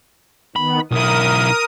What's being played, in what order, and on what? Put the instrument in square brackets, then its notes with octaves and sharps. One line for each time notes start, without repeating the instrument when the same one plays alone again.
[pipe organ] D#3 B3 [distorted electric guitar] B5
[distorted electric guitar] B1 E4 [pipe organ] A#4 D#6